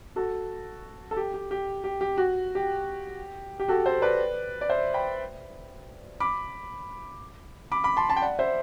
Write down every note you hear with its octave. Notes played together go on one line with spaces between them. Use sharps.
F#4 A4
A4
G4
G4
G4
G4
G4
F#4
G4
G4
F#4 A4
A4 C5
B4 D5
D5
C5 E5
G5 B5
B5 D6
B5 D6
B5 D6
A5 C6
A5 C6
G5
D5 F#5
C5 E5